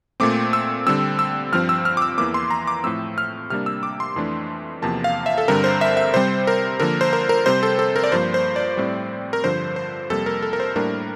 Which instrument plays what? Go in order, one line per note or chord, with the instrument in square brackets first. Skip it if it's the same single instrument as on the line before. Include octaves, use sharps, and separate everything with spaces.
[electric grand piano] A#2 A3 C4 D6
E6
D3 G3 C4 E6
E6
G2 F3 C4 F6
E6
F6
D6
E6
E2 E3 A#3 D6
C6
A#5
D6
A2 F3 A3 C4 E6
F6
C3 G3 A#3 D4 F6
E6
D6
C6
F2 E3 A3 D4
E2 C3 F3 A#3 A5
F5
E5
A4
G2 D3 G3 C4 A#4
C5
E5
E5
C3 G3 C4 C5
A#4
D3 F3 A#3 A#4
C5
A#4
A#4
C3 G3 C4 C5
A4
A4
A#4
D5
G2 F3 A#3 C5
C5
D5
A2 G3 C4
A#4
G2 D3 F3 C5
C5
F2 C3 G3 A#3 A4
A#4
A4
A#4
C5
A2 G3 A#3 D4 A#4